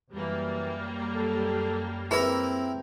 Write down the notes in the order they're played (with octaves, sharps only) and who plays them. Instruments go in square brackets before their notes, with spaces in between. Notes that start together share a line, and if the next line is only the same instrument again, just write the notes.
[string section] F#2 G3 A#3 [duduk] E3
[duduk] A4
[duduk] C4 [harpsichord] E4 A#4 [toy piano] G#4 B4